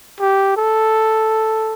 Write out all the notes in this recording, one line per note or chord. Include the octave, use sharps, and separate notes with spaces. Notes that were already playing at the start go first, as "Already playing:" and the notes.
G4
A4